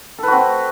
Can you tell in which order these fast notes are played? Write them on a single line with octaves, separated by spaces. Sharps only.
A4 B4 F#4 C4